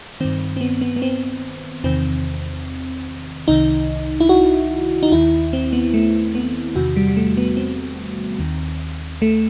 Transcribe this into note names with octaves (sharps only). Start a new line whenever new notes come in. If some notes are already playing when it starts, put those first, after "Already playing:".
G2 D#3 C4
C4
B3
B3
B3
C4
E2 C3 D#3 C4
C2 C3 D#3 D#4
E4
F#4
D#4
D#2 D#3 E4
C4
B3
A3
B3
E2 C3 D#3 F#4
G3
G3
A3
B3
C4
D#2 D#3
A3